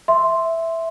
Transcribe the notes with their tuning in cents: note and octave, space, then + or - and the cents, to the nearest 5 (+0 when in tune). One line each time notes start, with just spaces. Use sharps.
E5 +0 C6 +0